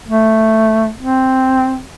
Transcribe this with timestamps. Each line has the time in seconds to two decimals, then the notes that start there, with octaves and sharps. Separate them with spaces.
0.08 A3
0.99 C4